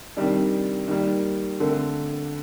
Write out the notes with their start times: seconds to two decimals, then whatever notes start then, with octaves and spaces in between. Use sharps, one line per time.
0.17 C3 D#3 G3 D4
0.88 D#3 G3 A#3
1.60 D3 A3 C4